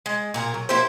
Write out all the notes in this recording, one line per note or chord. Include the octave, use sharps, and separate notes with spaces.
G#3
A#2 A#4 A#5
F#3
A#3 E4 G4 C5